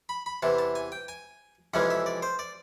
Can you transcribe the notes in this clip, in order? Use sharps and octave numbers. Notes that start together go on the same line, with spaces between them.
B5
B5
E2 C3 E3 A5
A5
G#5
G5
G#5
F2 C3 E3 G#3 C#4 F#5
E5
D5
C5
D5